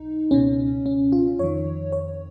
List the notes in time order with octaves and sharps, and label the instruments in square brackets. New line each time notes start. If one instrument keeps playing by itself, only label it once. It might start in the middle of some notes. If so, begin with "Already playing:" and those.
Already playing: [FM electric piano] B1 D#4
C#2 B2 C#4
C#4
F4
F2 D#3 C#5
C#5